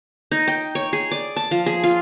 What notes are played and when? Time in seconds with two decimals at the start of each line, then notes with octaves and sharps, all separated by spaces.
0.32 D#4
0.48 G5
0.75 C#5
0.93 G#4
1.11 D5
1.36 A5
1.51 F3
1.66 G#4
1.84 F4